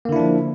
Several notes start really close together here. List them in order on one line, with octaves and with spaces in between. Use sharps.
A#3 D3 E4 D4 F3